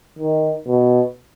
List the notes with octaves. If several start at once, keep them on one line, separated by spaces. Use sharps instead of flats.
D#3
B2